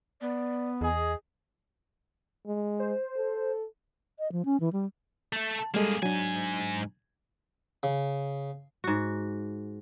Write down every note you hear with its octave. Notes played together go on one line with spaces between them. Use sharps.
B3 D5
E2 G#4 D#5
G#3
C5
A4
D#5
F3
C#4
E3
G3
A3 A4
A5
G3 G#3 A#3 G#4 A4
G#2 F#3 D4 G#5
C#3
G#2 F#4